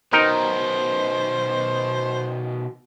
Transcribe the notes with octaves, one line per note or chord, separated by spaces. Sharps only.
B2 D#3 D#4 A#4 C5 G5